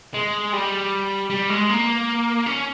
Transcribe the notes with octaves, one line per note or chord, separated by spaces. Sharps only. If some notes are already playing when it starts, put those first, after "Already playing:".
G#3
G3
G3
G#3
A#3
C#4